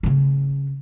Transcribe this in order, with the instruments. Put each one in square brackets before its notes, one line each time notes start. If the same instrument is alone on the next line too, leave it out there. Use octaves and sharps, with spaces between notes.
[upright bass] C#3 C#4